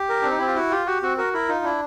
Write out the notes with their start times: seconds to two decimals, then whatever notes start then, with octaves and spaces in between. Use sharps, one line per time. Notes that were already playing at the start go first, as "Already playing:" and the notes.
Already playing: G4
0.09 A#4
0.22 C4 D4
0.30 D#4
0.38 C4 E4
0.47 F4
0.55 E4 F#4
0.71 F4 G4
0.86 F#4 G4
1.02 C4 F#4
1.17 F#4 A#4
1.33 E4 A#4
1.48 D#4 F4
1.64 D4 E4